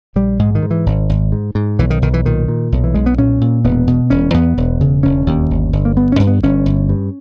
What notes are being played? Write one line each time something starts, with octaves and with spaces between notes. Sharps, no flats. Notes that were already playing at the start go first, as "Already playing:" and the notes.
A#1 G3
G#2 G#3
D#3
G#2
E3
G#1
G#1
G#2
G#2
B1 E3
D#3
B1 D#3
E3
A#2 D#3
A#2
B1
E3
B1 G#3
B3
A#2 C#4
A#2
E1 B3
B2
E1 C#4
E2 B3
E1
C#3
E1 C#4
D#2
G1
G1
A#3
G2 B3
C#4
G2
B3
G1 C#4
G1
G2